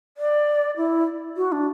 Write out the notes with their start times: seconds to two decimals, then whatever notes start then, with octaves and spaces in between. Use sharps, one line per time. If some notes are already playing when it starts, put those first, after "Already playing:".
0.17 D5
0.77 E4
1.37 F#4
1.52 D4